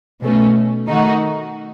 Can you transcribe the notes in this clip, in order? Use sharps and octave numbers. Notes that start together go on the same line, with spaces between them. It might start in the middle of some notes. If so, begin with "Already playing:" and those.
B2 A3 C#4
D#3 A3 D#4 F#4